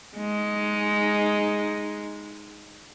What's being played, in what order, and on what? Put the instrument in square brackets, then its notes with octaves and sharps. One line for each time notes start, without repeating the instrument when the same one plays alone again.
[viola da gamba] G#3 D#4